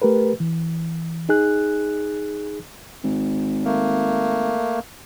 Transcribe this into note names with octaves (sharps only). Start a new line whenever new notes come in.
A3 G4 A#4 B4
E3
D#4 G#4 F#6
G#1
A3 A#3